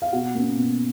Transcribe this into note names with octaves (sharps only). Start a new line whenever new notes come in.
F5
B2 F#4 F#5
A#3 C#4
B2